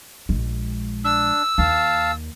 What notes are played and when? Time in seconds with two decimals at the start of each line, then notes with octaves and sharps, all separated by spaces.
0.29 A#1 G#3
1.05 D4 E6
1.58 D#2 F5 A5